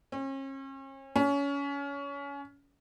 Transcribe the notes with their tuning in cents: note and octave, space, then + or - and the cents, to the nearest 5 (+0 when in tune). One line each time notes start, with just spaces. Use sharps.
C#4 -40
C#4 +25